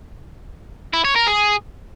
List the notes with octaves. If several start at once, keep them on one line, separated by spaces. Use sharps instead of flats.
E4
C#5
A#4
G#4